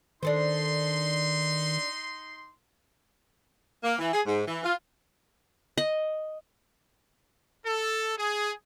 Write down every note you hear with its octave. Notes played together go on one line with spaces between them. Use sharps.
D#3 D4 D#4 A4 C5 C6
A#3
E3
G#4
G#2
E3
F4
D#5
A4
G#4